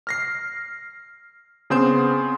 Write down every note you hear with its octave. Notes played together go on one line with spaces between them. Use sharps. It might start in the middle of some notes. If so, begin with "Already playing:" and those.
F6 A#6 C7
C#3 B3 C4 C6 G6 E7